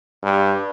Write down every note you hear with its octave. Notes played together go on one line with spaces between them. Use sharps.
G2